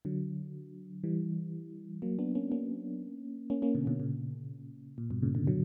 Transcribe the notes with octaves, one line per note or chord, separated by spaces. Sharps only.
D3 F#3
E3 G3
F#3 A#3
B3 D4
A#3 C#4
A#3 C#4
A#3 C#4
A#3 C#4
B2 D3
B2 D3
A#2 C#3
A#2
G2 B2
A#2 C#3
B2 D3
D3 F#3